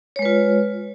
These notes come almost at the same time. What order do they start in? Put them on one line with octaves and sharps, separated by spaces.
C#5 G#3 B4 F4